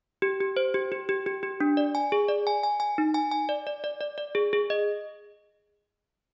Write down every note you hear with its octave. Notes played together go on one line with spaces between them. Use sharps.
G4
G4
C5
G4
G4
G4
G4
G4
D4
D5
G#5
G#4
D5
G#5
G#5
G#5
D#4
G#5
G#5
D5
D5
D5
D5
D5
G#4
G#4
D#5